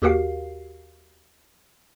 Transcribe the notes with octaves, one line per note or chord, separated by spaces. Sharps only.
D#2 F#4 G4 A#4 F5 C7